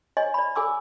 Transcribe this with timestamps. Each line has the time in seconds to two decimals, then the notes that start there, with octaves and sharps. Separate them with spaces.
0.17 C#5 D#5 G#5
0.34 D5 B5
0.56 A4 G#5 D6 E6